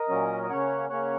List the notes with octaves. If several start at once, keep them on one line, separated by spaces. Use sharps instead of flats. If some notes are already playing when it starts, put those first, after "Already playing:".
Already playing: A#4 D#5
A#2 F#3 C#4
D#5
C#3 A#3 C#4 C#5 F#5
C#3 A#3 C#4 C#5 F#5